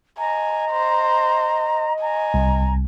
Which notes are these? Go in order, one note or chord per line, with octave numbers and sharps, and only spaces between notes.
D#5 G#5 A#5
C5
G#5 A#5
C2